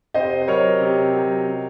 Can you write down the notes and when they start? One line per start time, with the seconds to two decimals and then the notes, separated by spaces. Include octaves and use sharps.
0.14 C3 C5 D#5
0.41 C5
0.47 F#3 A#4 C#5
0.80 C3
1.14 F#3
1.46 C3